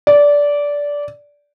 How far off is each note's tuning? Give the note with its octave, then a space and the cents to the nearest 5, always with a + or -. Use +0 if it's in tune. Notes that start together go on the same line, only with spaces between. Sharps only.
D5 -15